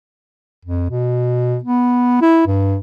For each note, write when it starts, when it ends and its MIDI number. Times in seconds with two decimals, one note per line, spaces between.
0.65 0.87 41
0.90 1.57 47
1.63 2.17 59
2.21 2.43 64
2.47 2.77 43